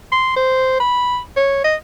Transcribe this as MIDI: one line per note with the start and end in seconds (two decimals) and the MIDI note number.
0.12 0.32 84
0.36 0.80 72
0.80 1.19 83
1.36 1.61 73
1.64 1.75 75